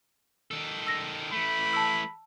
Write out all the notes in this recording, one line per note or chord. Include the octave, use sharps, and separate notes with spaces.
D#3 A4
E6 A#6
E3 A3 B5
A5 E6